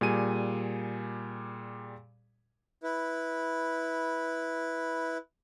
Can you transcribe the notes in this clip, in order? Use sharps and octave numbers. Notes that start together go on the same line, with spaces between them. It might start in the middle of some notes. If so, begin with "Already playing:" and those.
A#2 G3 G#4 G#5 D#7
E4 B4